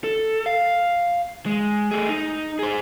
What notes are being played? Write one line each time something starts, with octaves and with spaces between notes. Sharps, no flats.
A4
F5
G#3
A3 G#4
D#4
G#4 C5